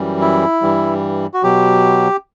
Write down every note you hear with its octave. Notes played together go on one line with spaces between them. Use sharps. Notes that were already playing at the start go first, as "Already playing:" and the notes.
Already playing: F#2 E3 G3
E4
G2 E3 G3
F#4
B2 F#3 G4